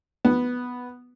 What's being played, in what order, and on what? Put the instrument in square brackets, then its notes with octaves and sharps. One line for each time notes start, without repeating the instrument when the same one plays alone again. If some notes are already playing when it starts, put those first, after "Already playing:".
[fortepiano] B3